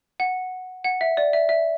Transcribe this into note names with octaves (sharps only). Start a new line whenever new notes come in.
F#5
F#5
E5
D5
E5
E5